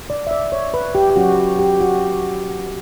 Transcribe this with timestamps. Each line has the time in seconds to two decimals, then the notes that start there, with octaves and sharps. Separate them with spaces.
0.10 D5
0.27 E5
0.31 D5
0.52 C#5
0.74 B4
0.95 G4
1.10 G4
1.16 F#3 C#4 F#4
1.59 G4
1.80 F#4